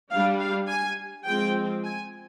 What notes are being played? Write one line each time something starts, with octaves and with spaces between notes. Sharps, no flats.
G3 D4 F5
F5
G#5
F3 G#3 C4 G5
G#5